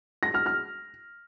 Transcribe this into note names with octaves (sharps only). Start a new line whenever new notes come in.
A#6
F6
F6